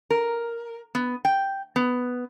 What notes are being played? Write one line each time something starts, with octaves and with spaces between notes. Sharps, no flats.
A#4
B3
G5
B3